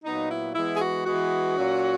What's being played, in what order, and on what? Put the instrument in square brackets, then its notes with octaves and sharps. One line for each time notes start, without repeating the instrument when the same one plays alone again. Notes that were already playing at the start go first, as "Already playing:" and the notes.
[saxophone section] A#2 F#3 B3 D#4
E4
E3 G#3 B3 E4
G#4
F#4
E3 G#3 B3 F#4
A#2 F#3 C#4